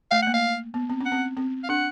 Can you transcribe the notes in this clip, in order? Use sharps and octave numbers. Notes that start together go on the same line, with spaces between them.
A3 F5
A#3 F#5
F5
B3
C4
C#4
F#5
C4
C4
F5
D4 F#5